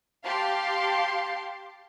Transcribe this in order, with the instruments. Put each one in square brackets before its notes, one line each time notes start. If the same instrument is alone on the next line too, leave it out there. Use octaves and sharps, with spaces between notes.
[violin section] G4 F5 A5 C6